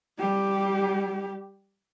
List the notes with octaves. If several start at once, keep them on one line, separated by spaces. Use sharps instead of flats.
G3 G4